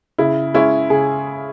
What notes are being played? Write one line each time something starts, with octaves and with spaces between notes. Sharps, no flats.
C#3 E4
G#3 C#4 E4
C#3 G#4